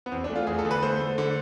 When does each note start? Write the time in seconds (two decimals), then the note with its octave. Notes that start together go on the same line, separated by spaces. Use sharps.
0.06 B3
0.12 E2 C4
0.24 D4
0.30 A3
0.35 F4
0.47 E2 G#4
0.59 A4
0.65 D3
0.71 B4
0.82 A3 C5
1.00 A3
1.18 D3